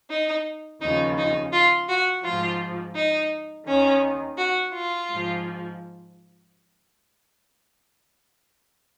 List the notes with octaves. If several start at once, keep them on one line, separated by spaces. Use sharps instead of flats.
D#4
D#2 C#3 F3 D#4
D#4
F4
F#4
G#2 F3 F4
D#4
D#2 D#3 C#4
F#4
F4
G#2 F3